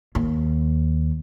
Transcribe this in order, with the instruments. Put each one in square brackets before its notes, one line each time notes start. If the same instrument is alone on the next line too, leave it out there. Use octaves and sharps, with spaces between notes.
[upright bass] D#2